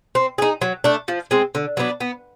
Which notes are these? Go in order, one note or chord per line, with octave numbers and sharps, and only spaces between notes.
C4
D#4 G#4
F#3
A3 D4
F3
G#3 C4
D3
F#3 B3 D4
B3